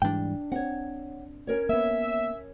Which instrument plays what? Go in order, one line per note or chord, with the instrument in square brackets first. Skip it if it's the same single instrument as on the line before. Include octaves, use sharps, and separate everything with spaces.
[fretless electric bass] G#2 E3 G3 [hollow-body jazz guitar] D4 G5
[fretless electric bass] C4 [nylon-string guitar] C#5 F#5
[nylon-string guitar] C#4 A#4 C#5
[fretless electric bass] A#3 B3 [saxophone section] E5